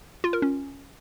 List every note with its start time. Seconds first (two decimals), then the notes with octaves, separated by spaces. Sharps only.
0.24 F4
0.33 A#4
0.42 C#4